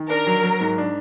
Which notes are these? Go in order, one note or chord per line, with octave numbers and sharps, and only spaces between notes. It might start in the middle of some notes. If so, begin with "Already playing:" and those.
Already playing: D#3
D4 A#4
F#3
F#3
G#2
D4